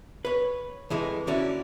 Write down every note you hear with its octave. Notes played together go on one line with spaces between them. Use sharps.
B4 C#5
F2 E3 G#3
D3 A#3 C#4 E4 F#4 D5